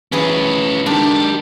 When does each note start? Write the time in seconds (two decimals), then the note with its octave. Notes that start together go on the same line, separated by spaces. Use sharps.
0.12 E3 C#4 G#4 B4 D#5
0.86 D#3 G#3 D4 G4